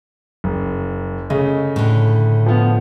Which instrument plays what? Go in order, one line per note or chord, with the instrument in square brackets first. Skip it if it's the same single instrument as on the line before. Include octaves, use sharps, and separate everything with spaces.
[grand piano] F#1
[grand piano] C#3 D#5 [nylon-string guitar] A3
[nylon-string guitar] A2 D3
[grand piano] F3 B3